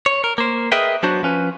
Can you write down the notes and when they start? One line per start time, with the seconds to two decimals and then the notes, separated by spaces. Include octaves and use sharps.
0.06 C#5
0.24 A#4
0.38 A#3 C5
0.72 G#4 A#4 B4 D#5 E5 G5
1.03 F#3 B3 D4 F#4 C5
1.23 F3 C#4 B4